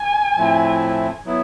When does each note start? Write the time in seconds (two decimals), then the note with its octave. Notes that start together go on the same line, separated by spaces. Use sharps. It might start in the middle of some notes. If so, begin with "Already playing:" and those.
Already playing: G#5
0.36 A2 F3 A3 C4 E4
1.26 F#3 B3 E4